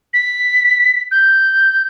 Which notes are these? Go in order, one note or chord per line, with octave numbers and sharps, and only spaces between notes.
B6
G6